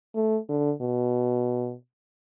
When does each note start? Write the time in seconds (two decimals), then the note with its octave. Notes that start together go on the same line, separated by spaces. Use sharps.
0.15 A3
0.49 D3
0.81 B2